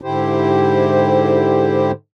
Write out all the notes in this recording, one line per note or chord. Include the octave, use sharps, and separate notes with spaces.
G#2 D3 E4 G4 C5